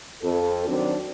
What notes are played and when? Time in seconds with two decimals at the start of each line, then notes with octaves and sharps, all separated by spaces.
0.23 F2 A4
0.67 D#3 F#3 C4 D4